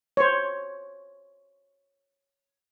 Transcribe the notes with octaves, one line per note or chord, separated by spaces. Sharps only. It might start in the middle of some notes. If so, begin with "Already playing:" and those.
C5 C#5